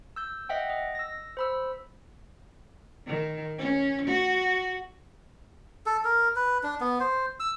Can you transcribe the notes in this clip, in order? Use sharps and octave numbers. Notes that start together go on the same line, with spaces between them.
E6 G6
D#5 E5 F#5 G5
D#5
E6 A#6
C5 B5 E6
D#3
C#4
F#4
A4
A#4
B4
D4
B3
C5
E6